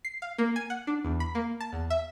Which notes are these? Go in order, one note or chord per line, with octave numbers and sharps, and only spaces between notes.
C7
F5
A#3
G#5
F#5
D4
E2
B5
A#3
A5
E2
E5